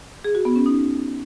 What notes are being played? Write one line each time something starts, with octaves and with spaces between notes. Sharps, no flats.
G#4
F#4
B3
C#4
D#4